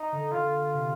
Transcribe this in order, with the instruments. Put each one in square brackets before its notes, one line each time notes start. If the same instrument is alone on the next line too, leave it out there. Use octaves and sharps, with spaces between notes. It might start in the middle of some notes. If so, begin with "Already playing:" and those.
Already playing: [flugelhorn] D#4
[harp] D3
[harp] D3 [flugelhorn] F4
[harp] C3